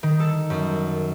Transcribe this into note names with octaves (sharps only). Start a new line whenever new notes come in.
D#3
A4
F#2